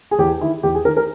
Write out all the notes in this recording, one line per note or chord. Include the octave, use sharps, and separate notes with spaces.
G#4
E2 G4
D#3 E4
E2 G4
G#4
D#3 A#4
A#4